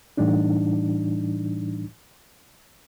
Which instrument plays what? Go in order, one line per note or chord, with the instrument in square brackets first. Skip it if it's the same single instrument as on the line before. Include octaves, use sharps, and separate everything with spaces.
[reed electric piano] A2 E3 G3 D4 D#4